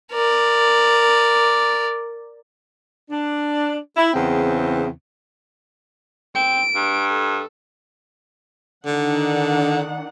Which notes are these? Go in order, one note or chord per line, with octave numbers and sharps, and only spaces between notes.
A#4 D5
D4
E4
E2 C#3 C4
C4 D7
G2
A4
D3 D#3 D4 F#5